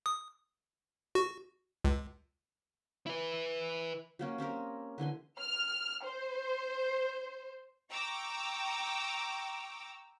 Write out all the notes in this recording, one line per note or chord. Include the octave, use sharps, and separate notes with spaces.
D#6
F#4
C#2
E4 B4
F#3 A#3 C#4
C4 C#4 G4 A#4
D3 E3 G#5 C6
F6
C5
G5 A#5 C#6 D6 E6